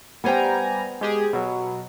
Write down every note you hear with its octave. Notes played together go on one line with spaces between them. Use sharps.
G3 B3 C5 G5 G#5 A#5
G#3 G4 G#4
B2 F#3